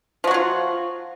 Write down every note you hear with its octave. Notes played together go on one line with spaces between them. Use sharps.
F3 F#3 F4 F#4